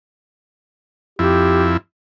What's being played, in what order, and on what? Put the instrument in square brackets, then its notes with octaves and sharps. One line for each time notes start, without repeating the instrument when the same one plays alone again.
[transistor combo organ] F2 E4 [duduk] G4